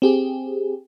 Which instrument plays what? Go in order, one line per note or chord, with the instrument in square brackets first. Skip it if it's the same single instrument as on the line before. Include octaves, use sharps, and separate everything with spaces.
[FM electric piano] C4 G4 G#4